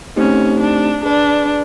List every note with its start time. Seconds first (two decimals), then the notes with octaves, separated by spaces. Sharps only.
0.16 A3 C4 C#4 D#4 G4 C5
0.60 D4
1.03 D4 G#4 B4 D5